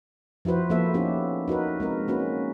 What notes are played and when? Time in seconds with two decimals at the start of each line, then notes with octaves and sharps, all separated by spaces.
0.45 F3 E4 F#4 B4 C5
0.70 F3 A#3 B3 E4 A4 E5
0.94 B3 C#4 D#4 E4 G4 A4
1.48 D#4 F#4 A#4 B4
1.80 G#3 C4 A#4
2.08 A#3 C#4 F#4 B4